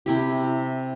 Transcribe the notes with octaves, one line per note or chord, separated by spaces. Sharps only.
C3 E4 G4